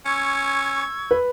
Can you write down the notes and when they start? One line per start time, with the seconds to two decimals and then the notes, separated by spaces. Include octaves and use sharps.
0.06 C#4 C#6 E6 G#6
1.11 B4